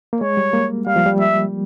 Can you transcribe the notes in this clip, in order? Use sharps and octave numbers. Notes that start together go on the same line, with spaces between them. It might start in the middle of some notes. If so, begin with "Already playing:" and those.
A#3
G#3 C#5
G3
A#3
G3 F5
F3
G3
E5